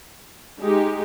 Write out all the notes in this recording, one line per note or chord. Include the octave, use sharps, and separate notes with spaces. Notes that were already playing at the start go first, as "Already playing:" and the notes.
G#3 D#4 G4